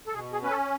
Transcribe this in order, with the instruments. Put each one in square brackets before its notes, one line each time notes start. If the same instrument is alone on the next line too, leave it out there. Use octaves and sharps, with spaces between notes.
[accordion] A4
B2 G#4
G#4
C#4 B4
A4